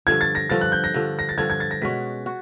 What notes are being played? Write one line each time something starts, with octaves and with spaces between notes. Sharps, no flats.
G2 D3 F3 G#6
A6
A#6
G2 D3 F3 A6
F#6
G6
A#6
G2 D3 F3
A#6
A6
G2 D3 F3 G#6
G#6
A6
A#6
B2 G#3 C#4 F#4 B6
F#4